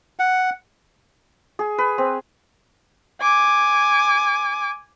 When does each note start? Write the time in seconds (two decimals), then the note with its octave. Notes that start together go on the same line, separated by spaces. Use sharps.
0.19 F#5
1.59 G#4
1.78 B4
1.98 C4
3.21 G#5 D6